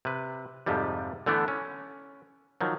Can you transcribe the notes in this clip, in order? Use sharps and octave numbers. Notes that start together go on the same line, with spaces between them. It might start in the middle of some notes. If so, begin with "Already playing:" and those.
C3 B4
F2 G#2 C3 F3 G3
D3 E3 A3 B3 D4
C#4
D#3 F3 F#3